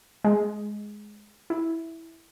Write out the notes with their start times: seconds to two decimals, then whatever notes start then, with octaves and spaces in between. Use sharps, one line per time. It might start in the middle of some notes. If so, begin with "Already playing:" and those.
0.24 G#3
1.50 E4